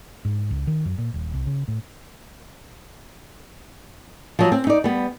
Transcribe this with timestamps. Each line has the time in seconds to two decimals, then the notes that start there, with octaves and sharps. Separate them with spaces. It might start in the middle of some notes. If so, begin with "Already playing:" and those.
0.25 G#2
0.51 C#2
0.67 D#3
0.85 F#2
0.98 A#2
1.14 D#1
1.34 C2
1.46 C#3
1.68 A2
4.39 F3 F#3
4.52 C4
4.67 D#4 D5
4.84 G3 B3